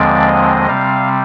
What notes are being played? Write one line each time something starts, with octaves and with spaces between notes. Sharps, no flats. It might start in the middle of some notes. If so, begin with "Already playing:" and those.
Already playing: D#2 D3 F3 G#3 C4 D5
D#5
C3 G3 C4 F5